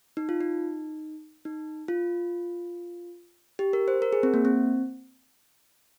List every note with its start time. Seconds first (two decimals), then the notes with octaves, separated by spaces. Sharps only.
0.17 D#4
0.29 F4
0.41 D#4
1.45 D#4
1.88 F4
3.59 G4
3.73 A#4
3.88 C5
4.02 A#4
4.12 G#4
4.23 C4
4.34 A#3
4.45 C4